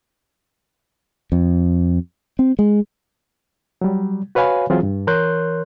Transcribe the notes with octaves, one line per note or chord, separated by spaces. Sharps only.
F2
C4
G#3
F#3 G3
F#4 B4 C#5 F5 G#5 B5
E3 F#3 C4 F4 G#4
G2
E3 A#4 C#5 C6 F#6 G6